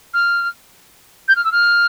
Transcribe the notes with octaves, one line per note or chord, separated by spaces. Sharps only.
F6
G6
F6
E6
F6